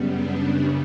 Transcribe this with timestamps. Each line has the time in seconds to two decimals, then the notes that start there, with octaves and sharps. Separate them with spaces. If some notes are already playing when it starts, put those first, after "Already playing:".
Already playing: F#2 C#3 G3 B3
0.14 D4